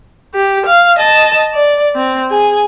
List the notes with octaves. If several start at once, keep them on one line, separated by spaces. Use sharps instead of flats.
G4
F5
D#5 A5
D5
C4
G#4 G#5